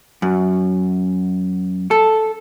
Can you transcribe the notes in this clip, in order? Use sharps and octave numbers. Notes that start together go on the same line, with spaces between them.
F#2
A4